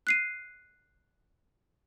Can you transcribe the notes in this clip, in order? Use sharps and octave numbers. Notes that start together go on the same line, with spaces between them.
F#6 C7 D#7